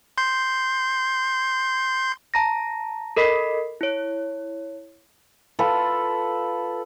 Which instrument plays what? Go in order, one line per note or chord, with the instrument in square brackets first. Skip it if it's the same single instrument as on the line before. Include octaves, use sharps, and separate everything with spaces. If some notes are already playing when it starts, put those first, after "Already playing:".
[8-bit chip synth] C6 G6 C7
[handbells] A5 A#5 A#6
A4 A#4 D#5 B5 B6 C7
E4 C#5
[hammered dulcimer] F4 A4 B4